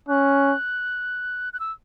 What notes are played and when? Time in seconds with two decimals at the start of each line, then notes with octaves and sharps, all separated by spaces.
0.09 C#4 F#6
1.53 F#6
1.60 E6